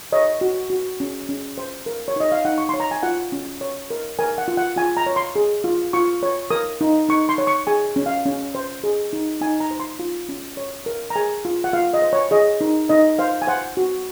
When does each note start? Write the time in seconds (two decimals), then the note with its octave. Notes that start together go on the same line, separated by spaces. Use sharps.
0.12 C#5 D#5
0.41 F#4
0.70 F#4
1.00 C#4
1.29 C#4
1.58 C5
1.86 A#4
2.08 C#5
2.16 D#4 D#5
2.32 F5
2.45 D#4 F#5
2.58 C#6
2.69 C#5 C6
2.80 A#5
2.91 G#5
3.03 F4 F#5
3.32 C#4
3.61 C#5
3.90 A#4
4.19 A#4 G#5
4.38 F#5
4.48 F4
4.57 F#5
4.76 F4 G#5
4.97 A#5
5.06 C#5
5.16 C6
5.36 G#4
5.64 F4
5.93 F4 C#6
6.23 C#5
6.51 A#4 D#6
6.81 D#4
7.09 D#4 C#6
7.29 C6
7.38 C#5
7.47 C#6
7.67 G#4 G#5
7.96 C#4
8.06 F5
8.26 C#4
8.55 C5
8.84 G#4
9.13 D#4
9.41 D#4 G#5
9.60 A#5
9.71 C5
9.80 C6
9.99 F4
10.29 C#4
10.57 C#5
10.86 A#4
11.10 A#5
11.16 G#4 G#5
11.45 F4
11.64 F#5
11.73 F4 F5
11.94 D#5
12.02 C5
12.13 C#5
12.31 G#4 D#5
12.61 D#4
12.89 D#4 D#5
13.19 C5 F5
13.42 G#5
13.47 C5 F#5
13.77 F#4